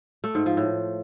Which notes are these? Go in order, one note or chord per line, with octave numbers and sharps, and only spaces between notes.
A3
G#2
F3
A2